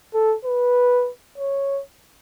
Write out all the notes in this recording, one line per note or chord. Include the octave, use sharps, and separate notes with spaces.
A4
B4
C#5